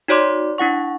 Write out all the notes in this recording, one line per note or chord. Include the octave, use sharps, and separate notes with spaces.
D#4 F#4 C#5 D5 C6 D6
D4 E4 F#5 C#6